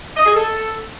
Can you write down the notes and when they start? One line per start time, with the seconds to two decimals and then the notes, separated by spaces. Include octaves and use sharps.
0.17 D#5
0.26 G#4
0.35 A4